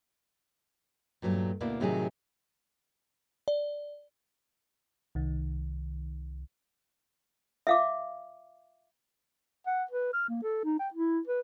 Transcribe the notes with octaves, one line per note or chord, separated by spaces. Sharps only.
G2 A#2 F#3 G#3 A3
D2 B2 A#3 E4 D5
A2 C3 D#3 F#3 F#4 G#4
D5
C2 D#3
E5 F5 D6
F#5
B4
F6
A#3
A4
D#4
G5
E4
B4